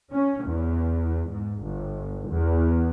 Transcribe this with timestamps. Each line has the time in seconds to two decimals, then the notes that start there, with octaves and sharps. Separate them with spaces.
0.11 C#4
0.46 E2
1.30 G#2
1.63 G1
2.29 E2